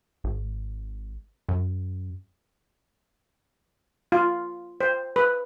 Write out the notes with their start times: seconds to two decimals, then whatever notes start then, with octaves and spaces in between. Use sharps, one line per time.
0.24 G#1
1.49 F#2
4.12 F4
4.81 C5
5.16 B4